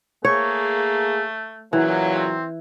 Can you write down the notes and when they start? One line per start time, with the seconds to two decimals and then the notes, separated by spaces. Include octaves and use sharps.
0.25 A3 A#3 G#4 C#5
1.73 A#2 C#3 E3 F#3
2.15 C4